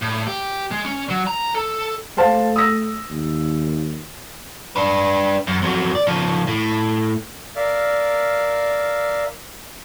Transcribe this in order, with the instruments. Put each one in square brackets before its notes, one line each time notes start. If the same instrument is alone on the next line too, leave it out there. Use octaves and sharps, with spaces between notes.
[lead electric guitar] A2
G4
G#3
C#4
F#3
A#5
A4
[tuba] A3 [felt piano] C5 F5 A5
[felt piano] D#6 E6 A#6
[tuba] D#2
[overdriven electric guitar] D4 B4
F#2
F2 F#3
D5
C#3 F3
A2
[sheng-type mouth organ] A#4 D5 E5 F5